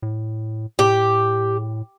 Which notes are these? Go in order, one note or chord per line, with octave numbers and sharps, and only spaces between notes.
A2
A2 G4